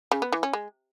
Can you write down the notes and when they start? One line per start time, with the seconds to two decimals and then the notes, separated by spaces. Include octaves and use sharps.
0.12 C#3
0.22 B3
0.32 E3
0.43 C#4
0.53 G#3